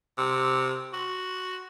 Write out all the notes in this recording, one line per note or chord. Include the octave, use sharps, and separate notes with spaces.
C3
F#4